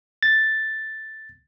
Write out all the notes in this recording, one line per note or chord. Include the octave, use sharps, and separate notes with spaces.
A6